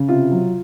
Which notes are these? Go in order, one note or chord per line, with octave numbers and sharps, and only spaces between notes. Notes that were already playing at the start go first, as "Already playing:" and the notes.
Already playing: C#3
C3 F4
F#3